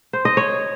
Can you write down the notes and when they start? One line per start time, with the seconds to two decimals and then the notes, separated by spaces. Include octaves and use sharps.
0.13 C5
0.25 D#5
0.37 C#5